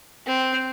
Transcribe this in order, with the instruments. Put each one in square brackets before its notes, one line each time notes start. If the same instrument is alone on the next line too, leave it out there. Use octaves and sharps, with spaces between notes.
[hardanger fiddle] C4